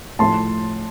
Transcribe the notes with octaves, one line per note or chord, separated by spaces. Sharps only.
A2 F3 A3 A5 C6